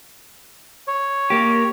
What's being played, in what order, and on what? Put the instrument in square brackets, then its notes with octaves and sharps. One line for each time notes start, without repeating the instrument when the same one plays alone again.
[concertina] C#5
[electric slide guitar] A#3 G4